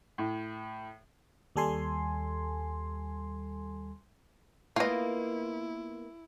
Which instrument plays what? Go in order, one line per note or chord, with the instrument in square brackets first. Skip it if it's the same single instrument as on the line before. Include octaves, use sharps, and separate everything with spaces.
[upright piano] A2
[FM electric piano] D#2 G3 A4 G#5 C6
[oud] A#3 B3 [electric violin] E4 [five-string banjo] F4 D#5